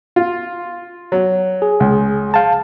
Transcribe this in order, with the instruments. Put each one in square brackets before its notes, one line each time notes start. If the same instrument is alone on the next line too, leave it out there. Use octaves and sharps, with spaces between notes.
[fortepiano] F4
F#3
[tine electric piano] G#4
[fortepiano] C#2
[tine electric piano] F5 A5